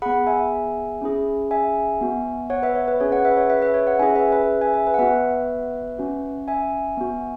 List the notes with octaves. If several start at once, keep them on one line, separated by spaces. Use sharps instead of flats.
B3 G#4 F#5 B5
E5 G#5
C#4 E4 G#4
E5 G#5
B3 F#4
C#5 F#5
B4 E5
C#5
B4
C#4 G#4 C#5
C#5 F#5
B4 E5
C#5
B4 E5
B4 E5
C#5
C#5 F#5
C#4 E4 G#4 E5 G#5
B4 E5
B4 E5
E5 G#5
E5 G#5
B4 E5
F#5
B3 F#4 B4 E5
C#4 F#4
E5 G#5
B3 F#4